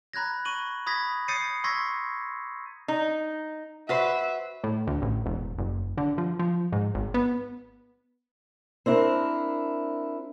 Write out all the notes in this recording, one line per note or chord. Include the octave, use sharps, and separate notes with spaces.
A#5 B5 F#6 G#6 A#6
C#6 D#7 F#7
B5 D#6 G#6 A#6 B6
D#6 G6 A6 C7 C#7 D#7
C6 C#6 E6 G#6 A#6 B6
D#4
F#4 B4 C5 E5
A2
D2
A1
E1
F#1
D3
F3
F3
G#2
G#1
B3
C4 D4 E4 A#4